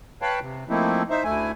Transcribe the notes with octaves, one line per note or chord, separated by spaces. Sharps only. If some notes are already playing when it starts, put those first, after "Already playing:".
B4 C#5 F5 G5 A5 B5
C3
F3 A3 A#3 C4 D#4 E4
D#4 C5 E5
D2 A3 E4 G#5